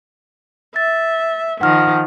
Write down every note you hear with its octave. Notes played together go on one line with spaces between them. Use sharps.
E5 A6
D#3 F3 F#5 F6